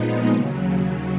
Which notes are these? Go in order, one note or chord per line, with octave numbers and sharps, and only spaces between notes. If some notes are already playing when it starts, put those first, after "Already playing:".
Already playing: A#2 F3 G#3 B3 D#4
D#2 C#3 F#3